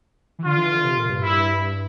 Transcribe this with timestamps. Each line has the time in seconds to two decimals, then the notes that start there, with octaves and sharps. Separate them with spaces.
0.39 E3
0.45 D3 F4
0.58 E3
0.71 D3
0.84 C3
0.97 A#2
1.09 G2
1.23 E4